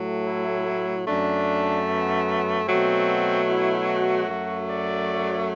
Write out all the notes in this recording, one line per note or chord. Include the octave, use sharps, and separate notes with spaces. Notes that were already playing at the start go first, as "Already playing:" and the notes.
Already playing: A2 F#3 A3
E4
F#2 F#3 A3 D4
B3
B2 F#3 A3 C4
E4
F#4
F#2 F#3 A3
D5